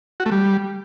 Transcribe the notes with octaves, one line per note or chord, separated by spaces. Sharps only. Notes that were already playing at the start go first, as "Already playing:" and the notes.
F#4
A3
G3